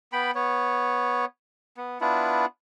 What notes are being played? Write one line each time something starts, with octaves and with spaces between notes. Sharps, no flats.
B3 G5 B5
B3 C#5
B3
B3 D4 E4 F4